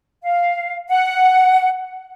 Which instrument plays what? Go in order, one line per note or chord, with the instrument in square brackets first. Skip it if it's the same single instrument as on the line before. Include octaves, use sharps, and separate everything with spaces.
[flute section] F5
F#5